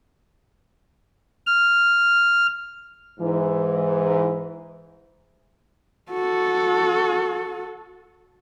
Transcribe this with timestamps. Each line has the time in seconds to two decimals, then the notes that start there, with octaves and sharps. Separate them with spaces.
1.47 F6
3.20 G#2 E3
6.11 F#4 A4